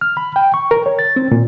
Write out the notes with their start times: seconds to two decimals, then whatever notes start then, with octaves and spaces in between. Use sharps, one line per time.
0.01 F6
0.17 B5
0.36 G5
0.54 C#6
0.71 A#4
0.86 C#5
0.99 A6
1.16 C4
1.31 A#2